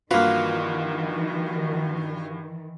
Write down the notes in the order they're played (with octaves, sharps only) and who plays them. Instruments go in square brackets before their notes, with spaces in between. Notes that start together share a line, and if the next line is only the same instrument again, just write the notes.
[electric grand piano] G2 F#4 [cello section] D#3 E3 [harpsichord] A#3 B4 [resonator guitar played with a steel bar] F4